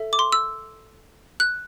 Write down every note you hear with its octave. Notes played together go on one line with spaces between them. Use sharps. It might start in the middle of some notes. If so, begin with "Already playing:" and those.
Already playing: A4 E5
D6
C6
E6
F#6